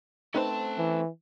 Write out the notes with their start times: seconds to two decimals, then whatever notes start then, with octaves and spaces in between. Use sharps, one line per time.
0.34 A3 C4 C#4 D#4 B4 C5 A5
0.78 E3